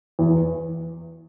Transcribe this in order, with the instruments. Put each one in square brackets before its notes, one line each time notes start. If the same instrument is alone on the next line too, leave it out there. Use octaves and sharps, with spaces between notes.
[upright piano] E2